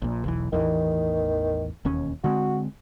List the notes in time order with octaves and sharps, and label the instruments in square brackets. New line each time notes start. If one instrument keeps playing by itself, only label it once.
[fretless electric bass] A#1 A#2
E1 B1 E3
[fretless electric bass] A1 E2 E3 [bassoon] D#3
[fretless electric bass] E1 D#2 C#4
[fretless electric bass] D3 G#3 C4 [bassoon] F#4